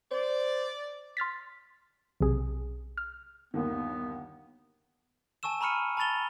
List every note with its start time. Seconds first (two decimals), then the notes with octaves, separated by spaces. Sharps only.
0.11 C5 D5
1.17 C6 F6 A6 B6
2.20 B1 C3 G#4
2.98 F6
3.54 G1 D#2 D#3 B3
5.43 G#5 A5 C#6 E6 E7
5.61 A#5 B5 C#6 F6 C#7 D#7
5.97 A5 B5 C#6 A6 F7 G7